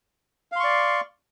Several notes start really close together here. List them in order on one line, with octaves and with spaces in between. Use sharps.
F5 C6 C#6 D5